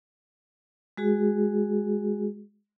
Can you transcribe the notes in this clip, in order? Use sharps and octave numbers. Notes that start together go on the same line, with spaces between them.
G#3 F#4 G#4